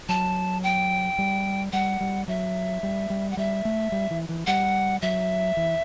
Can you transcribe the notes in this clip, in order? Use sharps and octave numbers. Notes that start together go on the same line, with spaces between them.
F#3 A5
G5
G3
G3 F#5
G3
F#3 E5
G3
G3
F#5
G3 E5
A3
G3
E3
E3
G3 F#5
F#3 E5
E3